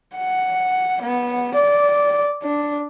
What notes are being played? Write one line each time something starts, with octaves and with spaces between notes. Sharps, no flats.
F#5
B3
D5
D4